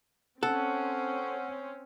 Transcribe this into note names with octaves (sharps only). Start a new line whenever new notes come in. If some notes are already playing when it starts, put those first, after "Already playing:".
C4 C#4 A4 F#5